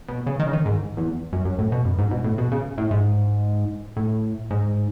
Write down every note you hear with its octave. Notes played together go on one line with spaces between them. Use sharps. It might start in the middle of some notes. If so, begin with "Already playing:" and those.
B2
C#3
D#3
C#3
D#3
G#2
E2
F#2
F#2
A2
B2
F#2
G#2
B2
A2
B2
C#3
A2
G#2
A2
G#2